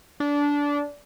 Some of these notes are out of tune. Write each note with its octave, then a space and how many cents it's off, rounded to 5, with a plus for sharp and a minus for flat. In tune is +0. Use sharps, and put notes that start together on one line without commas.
D4 -20